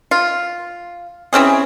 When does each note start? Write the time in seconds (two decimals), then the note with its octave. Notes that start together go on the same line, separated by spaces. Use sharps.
0.11 F4
1.33 E3 C4 C#4 G#4